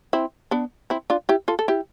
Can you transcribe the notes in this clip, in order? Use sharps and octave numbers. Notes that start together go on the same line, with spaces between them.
C4 E4
B3 D4
C4 E4
D4 F4
E4 G4
F4 A4
A4
E4 G4